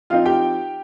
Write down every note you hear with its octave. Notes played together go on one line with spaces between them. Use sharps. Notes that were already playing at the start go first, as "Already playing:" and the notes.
F3 C4 D#4 F4 F5
G4 G5